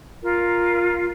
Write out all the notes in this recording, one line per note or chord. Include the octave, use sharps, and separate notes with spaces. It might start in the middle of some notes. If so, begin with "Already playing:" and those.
F4 A#4